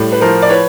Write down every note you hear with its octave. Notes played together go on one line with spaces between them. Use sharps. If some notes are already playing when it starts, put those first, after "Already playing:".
Already playing: A2 G3
B4
F3 A#4 C5
D5
B4 C#5